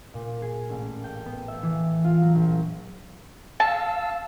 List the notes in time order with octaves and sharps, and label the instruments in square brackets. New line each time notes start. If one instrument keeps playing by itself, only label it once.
[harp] A#2
G#4
A1
G5
B3
E5
E3
F4
F#3
A#1
[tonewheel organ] F5 E6 [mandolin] A5